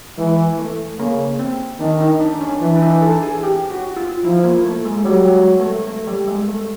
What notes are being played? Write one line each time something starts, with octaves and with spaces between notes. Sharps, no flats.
E3 G#3
A3
C#3 A#3
C4
D#3 D4
D#4
D4
D4
C#4
E3 D4
D4
D#4
A4
G#4
G4
F#4
F4
F3 E4
A#3
A3
G#3
G#3
F#3 G3
G#3
A3
A3
G3
G#3
A3